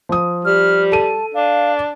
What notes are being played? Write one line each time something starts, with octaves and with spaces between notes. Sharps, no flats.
F3 D#6
G3 F6
A4 A5 D#7
D4 F5